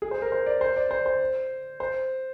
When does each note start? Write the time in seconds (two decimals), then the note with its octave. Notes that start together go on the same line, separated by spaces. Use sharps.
0.02 G#4
0.11 C5
0.22 A#4
0.32 C5
0.46 D5
0.61 C5
0.77 D5
0.91 C5
1.06 C5
1.80 C5